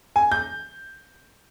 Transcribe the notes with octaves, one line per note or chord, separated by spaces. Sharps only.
G#5
G6